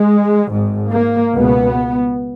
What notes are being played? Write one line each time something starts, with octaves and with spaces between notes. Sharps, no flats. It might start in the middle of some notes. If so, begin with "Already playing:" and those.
Already playing: G#3
G#1 G#2
A#3
C#2 B2 B3